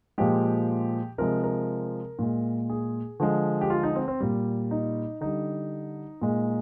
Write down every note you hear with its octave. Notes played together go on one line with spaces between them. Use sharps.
A#2 F3 G#3 G4
C3 F3 G#3 A#4
A#4
A#2 G#3
G#4
D3 F3 G#3
G4
F4
D#4
C4
C4
A#2 G3
D#4
D3 G3 D#4
A#2 G#3